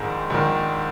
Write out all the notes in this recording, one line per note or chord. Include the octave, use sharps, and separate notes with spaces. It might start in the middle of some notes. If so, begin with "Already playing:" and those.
Already playing: A#1 G#2 D#3 G#4
A#1 G#2 D#3